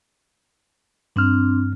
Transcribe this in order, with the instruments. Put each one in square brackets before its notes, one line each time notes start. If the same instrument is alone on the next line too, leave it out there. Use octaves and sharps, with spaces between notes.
[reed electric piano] G2 F6 [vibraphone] C4 D4